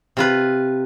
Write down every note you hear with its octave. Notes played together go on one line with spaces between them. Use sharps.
C3 F4 B4